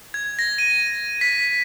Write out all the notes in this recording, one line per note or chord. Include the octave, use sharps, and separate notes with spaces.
G#6
A#6
D#7
B6